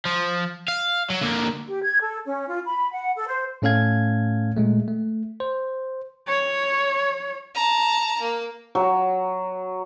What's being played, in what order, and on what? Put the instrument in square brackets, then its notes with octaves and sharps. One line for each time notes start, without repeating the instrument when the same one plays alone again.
[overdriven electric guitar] F3
F5
F#3
D3 A#3
[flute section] G4
G#6
A4
C#4
F4
B5
F#5
A4
C5
[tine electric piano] A2 A3 C#4 A4 F5 G#6
A#2 G#3 A3
A3
C5
[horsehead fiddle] C#5
[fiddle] A5 A#5
A#3
[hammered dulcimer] F#3